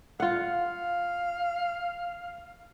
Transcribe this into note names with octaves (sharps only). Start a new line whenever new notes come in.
F4 F5 F#5